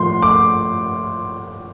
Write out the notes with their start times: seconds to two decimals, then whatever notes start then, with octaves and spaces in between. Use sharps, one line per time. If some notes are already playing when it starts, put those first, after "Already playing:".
Already playing: A2 F3 C6
0.22 D6